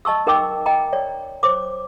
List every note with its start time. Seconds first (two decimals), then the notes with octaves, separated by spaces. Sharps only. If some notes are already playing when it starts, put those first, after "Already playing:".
0.05 D#5 A5 C#6 E6
0.27 D#4 A#4 D#5 G5 D6 E6
0.66 D#5 G5 A#5
0.93 C#5 D5
1.43 C5 C#5 D6